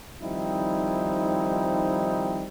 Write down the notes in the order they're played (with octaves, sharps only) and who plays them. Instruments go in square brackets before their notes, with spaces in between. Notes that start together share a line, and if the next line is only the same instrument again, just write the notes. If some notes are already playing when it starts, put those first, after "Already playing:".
[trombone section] D#3 F3 G3 C4 D#4 E4